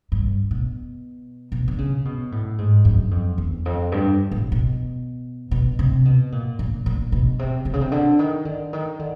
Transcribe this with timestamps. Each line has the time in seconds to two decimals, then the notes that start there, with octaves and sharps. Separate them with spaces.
0.12 G2
0.51 B2
1.52 B2
1.68 D3
1.78 C#3
2.05 B2
2.32 A2
2.58 G#2
2.85 F#2
3.11 F2
3.38 E2
3.66 F2
3.92 G2
4.31 A2
4.52 B2
5.51 B2
5.79 C3
6.05 B2
6.32 A#2
6.59 A#2
6.86 A#2
7.12 B2
7.39 C3
7.65 C3
7.73 C#3
7.81 C3
7.92 D3
8.19 D#3
8.45 D3
8.73 D#3
8.99 D3